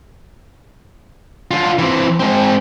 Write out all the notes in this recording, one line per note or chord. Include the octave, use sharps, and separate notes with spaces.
D3 F4
E3 C4
G#3 C4